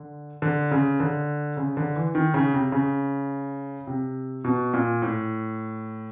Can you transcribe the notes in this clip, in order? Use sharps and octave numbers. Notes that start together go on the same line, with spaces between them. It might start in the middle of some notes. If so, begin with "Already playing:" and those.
Already playing: D3
D3
C#3
D3
C#3
D3
E3
D#3
C#3
C3
C#3
C3
B2
A#2
A2